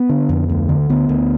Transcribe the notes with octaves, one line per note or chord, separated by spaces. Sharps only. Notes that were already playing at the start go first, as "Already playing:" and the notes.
Already playing: B3
D3
F2
D2
D3
D2 B3
D2